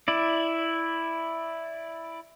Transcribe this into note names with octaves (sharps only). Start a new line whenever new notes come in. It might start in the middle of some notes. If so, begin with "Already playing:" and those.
E4 D5